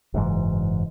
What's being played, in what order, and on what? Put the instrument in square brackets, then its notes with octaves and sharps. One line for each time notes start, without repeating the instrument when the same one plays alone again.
[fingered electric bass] F#1 G#2 E3